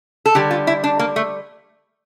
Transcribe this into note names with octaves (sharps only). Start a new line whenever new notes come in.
A4
D3 G3 G4
F4
E4
D4
A#3
A3